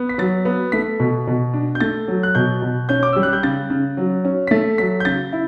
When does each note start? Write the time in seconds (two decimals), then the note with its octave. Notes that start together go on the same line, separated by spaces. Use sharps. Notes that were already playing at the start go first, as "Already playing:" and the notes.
Already playing: B3
0.09 B6
0.18 F#3 A6
0.45 B3
0.72 A3 B6
1.00 B2
1.27 B2
1.53 D4
1.75 G6
1.80 A3 A6
2.08 F#3
2.23 F#6
2.35 B2 G6
2.62 B2
2.89 C#4 G6
3.03 D6
3.13 G3 E6
3.23 F#6
3.33 G6
3.43 C#3 A6
3.70 C#3
3.97 F#3
4.25 C#4
4.47 B6
4.51 A3 A6
4.78 F#3 B6
5.00 G6
5.05 C#3 A6
5.33 E4